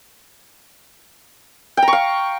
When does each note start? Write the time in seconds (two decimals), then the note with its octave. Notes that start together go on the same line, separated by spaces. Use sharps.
1.77 G5
1.82 A#5
1.88 C#6
1.93 F5